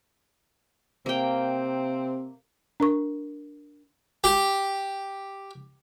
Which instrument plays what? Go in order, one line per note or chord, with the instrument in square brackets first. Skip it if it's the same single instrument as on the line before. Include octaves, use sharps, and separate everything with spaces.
[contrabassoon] C3 [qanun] A#3 G5 [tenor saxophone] C4
[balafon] D4 A#4 C#6
[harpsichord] G4